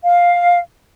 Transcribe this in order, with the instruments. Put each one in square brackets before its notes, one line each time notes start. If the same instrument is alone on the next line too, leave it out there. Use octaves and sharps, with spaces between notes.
[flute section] F5